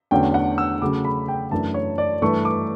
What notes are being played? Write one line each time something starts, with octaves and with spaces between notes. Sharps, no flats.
E2 D3 F#3 A3 C#4 G5
F#5
E6
C#3 F#3 A3 D6
B5
G5
F#2 E3 A3 D4 A5
C#5
D5
G2 E3 A3 D4 C#6
D6